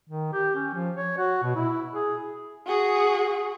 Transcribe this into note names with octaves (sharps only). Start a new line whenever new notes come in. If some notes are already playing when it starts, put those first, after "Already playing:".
D#3
G4
C#4
F3
C#5
F#4
B2
E4
G#4
F#4 G#4